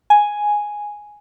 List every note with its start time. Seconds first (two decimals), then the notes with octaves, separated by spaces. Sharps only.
0.10 G#5